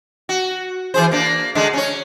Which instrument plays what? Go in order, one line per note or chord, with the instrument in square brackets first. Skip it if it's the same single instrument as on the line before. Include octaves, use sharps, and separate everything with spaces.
[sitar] F#4
E3 G#4 C5
A#3 D4
D3 G#3 D4
C#4 C#5